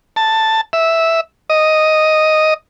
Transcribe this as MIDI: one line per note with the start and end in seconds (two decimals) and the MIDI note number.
0.16 0.61 81
0.73 1.21 76
1.50 2.54 75